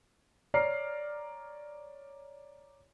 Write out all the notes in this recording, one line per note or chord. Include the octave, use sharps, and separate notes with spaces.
C#5 D5 A#5 F6 C7